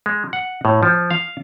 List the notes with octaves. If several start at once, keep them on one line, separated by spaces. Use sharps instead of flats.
G#3
F#5
A2
F3
F5